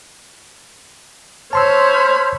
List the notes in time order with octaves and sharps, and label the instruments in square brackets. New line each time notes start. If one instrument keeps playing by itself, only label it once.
[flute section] C5 B5 F6 [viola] C#5 [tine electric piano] A5 C6 E6